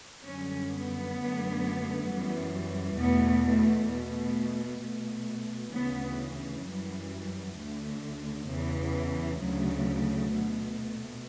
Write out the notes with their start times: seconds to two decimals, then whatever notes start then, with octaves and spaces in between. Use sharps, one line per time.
0.24 F#2 D3 G3 C#4
0.70 B3
1.16 F#2 D3 F#3 A3
2.07 F#2 E3 G3
2.98 E2 B2 A3 B3
3.45 A3
3.90 B2 A3
4.81 B2 A3
5.73 D2 C#3 E3 B3
6.64 F#2 E3 G3
7.56 D2 D3 A3
8.47 E2 C#3 E3
9.38 D2 C#3 F#3 A3
10.30 B2 A3